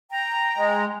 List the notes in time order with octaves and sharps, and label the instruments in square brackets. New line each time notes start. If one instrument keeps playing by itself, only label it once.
[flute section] G5 A#5
[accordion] G#3